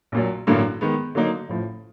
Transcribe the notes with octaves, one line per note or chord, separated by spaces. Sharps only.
A#1 A#2 F#3
A1 G2 D3 F#3 A#3
D#3 G#3 B3
D3 F#3 A#3 D#4
A1 A2 F3